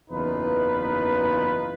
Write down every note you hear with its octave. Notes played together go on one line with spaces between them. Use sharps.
F#1 E2 E3 D#4 F4 B4